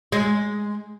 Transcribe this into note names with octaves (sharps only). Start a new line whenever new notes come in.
G#3